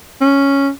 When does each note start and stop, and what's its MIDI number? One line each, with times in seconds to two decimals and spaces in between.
0.21 0.70 61